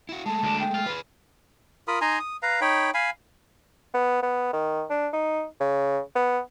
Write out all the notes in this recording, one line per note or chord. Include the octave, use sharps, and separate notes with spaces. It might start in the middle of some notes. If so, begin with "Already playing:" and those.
E4 F#4
G#3 A3 A5
D2 D4
G5
F4
G#4 B4
F4 A#4 B5 D#6
D#4 G#5 A#5 C6
D#6
B4 F5 A#5
D#4 C#5 G5 B5
F5 G#5 B5
B3
B3
D#3
D4
D#4
C#3
B3